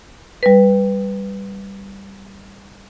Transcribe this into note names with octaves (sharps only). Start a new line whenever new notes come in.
G3 B4